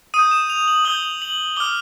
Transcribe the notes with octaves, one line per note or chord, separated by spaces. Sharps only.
D#6 G6 D#7
E7
F7
F#7
D#6 G6 G7
F#7
D6 F6 G7